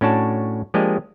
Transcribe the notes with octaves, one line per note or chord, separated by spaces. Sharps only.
A2 C#4 D4 F#4 A5
F3 G#3 A#3 D4 G4 D#5